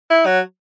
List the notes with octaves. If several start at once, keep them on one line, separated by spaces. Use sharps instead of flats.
E4
F#3